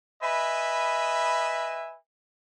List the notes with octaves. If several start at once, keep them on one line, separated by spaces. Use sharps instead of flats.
B4 D#5 E5 G#5 B5